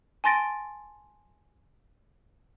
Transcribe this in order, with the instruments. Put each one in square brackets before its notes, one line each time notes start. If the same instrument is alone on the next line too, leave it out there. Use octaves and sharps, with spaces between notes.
[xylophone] G#5 A5 C6 A6 A#6 D7